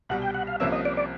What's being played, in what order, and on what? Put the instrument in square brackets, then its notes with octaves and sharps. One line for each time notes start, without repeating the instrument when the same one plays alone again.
[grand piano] C2 B2 G3 [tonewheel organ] F#5
[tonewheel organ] G5
F#5
F5
[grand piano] C2 C3 F3 A#3 C#4 [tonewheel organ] E5
[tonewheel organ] D#5
D5
D5